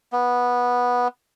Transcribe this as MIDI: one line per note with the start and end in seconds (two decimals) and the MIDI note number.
0.13 1.08 59